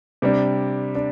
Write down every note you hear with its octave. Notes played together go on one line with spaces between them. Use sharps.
C3 G3 D4
D4